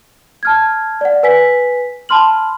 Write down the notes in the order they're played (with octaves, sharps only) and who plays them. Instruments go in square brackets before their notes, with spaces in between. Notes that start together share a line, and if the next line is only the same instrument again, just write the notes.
[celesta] A5 F6 G#6
D5 F#5
B4 G#5 B6
A5 B5 C6 F6 F#7